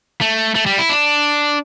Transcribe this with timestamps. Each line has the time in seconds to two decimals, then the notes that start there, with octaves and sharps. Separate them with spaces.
0.21 A3
0.55 A3
0.66 G3
0.78 E4
0.89 D4